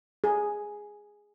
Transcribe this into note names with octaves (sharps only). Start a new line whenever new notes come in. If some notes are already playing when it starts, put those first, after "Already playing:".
G#4